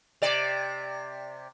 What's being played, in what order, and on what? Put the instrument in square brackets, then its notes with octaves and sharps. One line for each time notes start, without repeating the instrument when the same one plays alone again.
[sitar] C3 D5